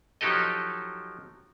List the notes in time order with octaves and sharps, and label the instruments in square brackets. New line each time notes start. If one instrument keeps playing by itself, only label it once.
[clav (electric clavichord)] F3 F#3 D#4 G4 A4 D#5